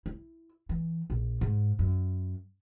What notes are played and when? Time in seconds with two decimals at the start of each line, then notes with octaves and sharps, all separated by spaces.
0.06 E4
0.69 E3
1.10 A#1
1.41 G#2
1.79 F#2